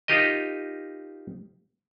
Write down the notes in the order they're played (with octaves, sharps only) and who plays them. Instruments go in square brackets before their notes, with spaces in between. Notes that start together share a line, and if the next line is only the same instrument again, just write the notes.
[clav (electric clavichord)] D#4 F4 G4 A#4 D#5